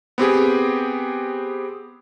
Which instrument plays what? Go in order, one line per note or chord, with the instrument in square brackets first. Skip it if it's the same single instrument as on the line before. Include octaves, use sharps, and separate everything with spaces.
[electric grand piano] B3 C4 G4 G#4